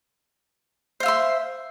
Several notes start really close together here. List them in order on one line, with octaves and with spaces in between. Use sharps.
C5 F5 E5 C6